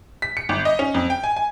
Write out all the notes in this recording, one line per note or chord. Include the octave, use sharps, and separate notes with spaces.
B6
C#7
G1
D#5
C#4
F2
G5
G#5
G#5